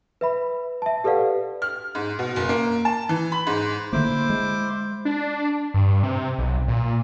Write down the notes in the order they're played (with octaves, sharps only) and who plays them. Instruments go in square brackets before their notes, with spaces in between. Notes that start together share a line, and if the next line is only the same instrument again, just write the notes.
[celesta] B4 E5 B5
E5 A5
G4 A4 B4 D5 F5 F#5
[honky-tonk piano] F6
G#2
B2
F#1
A#3
A5
E3
B5
G#2
[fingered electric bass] D3 A3 A#3 [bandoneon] E4 C5 D6
[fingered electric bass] G#3
[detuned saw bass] D4
G2
C3
B1
A#2